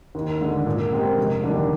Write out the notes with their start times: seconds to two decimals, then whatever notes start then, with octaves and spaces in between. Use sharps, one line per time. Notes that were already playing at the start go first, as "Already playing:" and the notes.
0.15 D#2
0.40 D3 G#3
0.66 A#2
0.92 G#3 C4 G4 A#4
1.18 F1
1.44 D#2 D3 G3 D4